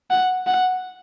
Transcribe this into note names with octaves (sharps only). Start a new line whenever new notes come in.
F#5
F#5